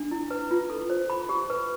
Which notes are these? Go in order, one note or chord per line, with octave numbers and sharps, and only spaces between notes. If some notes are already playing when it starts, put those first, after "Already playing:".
Already playing: D4
E4
B4
F4
A4
C5
B5
G4
B4